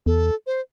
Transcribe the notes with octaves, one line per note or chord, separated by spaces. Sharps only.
E2 A4
C5